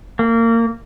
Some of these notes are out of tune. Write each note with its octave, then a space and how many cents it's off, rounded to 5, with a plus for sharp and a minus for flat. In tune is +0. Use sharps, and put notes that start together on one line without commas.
A#3 -25